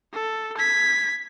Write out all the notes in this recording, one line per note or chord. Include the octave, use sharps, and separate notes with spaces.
A4
G#6 B6